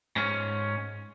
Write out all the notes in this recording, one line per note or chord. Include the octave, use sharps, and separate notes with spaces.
G#2 C#4